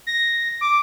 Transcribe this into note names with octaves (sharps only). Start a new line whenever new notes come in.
A#6
D6